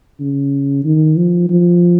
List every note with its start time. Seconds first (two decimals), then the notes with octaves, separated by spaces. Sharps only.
0.20 C#3
0.84 D#3
1.17 F3
1.50 F3